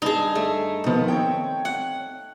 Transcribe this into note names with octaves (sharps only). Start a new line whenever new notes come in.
G2 D#4 G#4 A5
A3
D#3 F3 B3
C4 C#5 G5
F#5